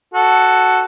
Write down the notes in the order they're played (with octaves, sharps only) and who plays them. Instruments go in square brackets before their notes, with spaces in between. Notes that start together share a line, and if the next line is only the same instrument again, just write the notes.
[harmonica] F#4 A4